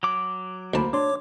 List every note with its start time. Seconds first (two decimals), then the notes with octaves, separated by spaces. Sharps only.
0.03 F#3 D6
0.74 D2 A#3 C5 A5 B5
0.93 D4 C#5 C6 D6